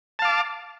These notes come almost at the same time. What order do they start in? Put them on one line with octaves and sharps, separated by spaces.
A5 F5 D6